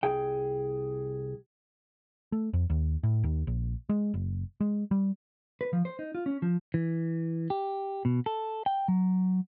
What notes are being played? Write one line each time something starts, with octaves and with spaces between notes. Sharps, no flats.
C2 G#4 G5
A3
F2
D#2
A2
D#2
A#1
G#3
F#1
G#3
G3
B4
F3
C5
D#4
F4
C#4
F3
E3
G4
B2
A4
G5
F#3